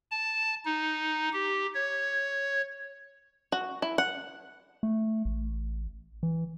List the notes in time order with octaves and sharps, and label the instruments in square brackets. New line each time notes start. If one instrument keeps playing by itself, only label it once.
[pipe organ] A5
D#4
G4
C#5
[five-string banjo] F#4
E4
F#5
[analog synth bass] A3
A1
E3